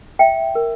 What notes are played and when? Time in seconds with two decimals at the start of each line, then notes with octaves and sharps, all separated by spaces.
0.19 E5 G5
0.55 A#4